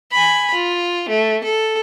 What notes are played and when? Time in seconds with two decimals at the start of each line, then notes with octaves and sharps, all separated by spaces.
0.11 G#5 B5
0.54 F4
1.09 A3
1.44 A4